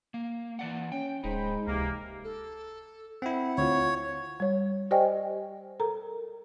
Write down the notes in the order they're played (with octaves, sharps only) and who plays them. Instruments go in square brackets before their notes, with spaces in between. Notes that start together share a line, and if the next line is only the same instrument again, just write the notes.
[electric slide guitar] A#3
E3 D5 F#5
[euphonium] C#4 [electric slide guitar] G5
[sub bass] D1 [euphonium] G#3 [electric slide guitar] D#4 [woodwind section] C5 G5 B5
[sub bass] C#2 [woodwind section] C3 E3 A#3
[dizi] A4
[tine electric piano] C4 E4 [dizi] F#5
[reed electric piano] D2 F4 [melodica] C#5
[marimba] G3 C#5
G4 C5 D5 D#5 G5 G#5
A4 A#4 A#5